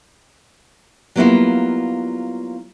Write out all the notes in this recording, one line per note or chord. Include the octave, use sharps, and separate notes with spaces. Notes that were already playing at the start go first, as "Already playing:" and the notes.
F#3 G3 A#3 B3 E4 F4